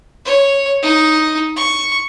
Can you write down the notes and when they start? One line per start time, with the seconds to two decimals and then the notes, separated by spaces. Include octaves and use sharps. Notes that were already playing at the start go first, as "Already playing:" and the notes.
0.25 C#5
0.82 D#4
1.56 C#6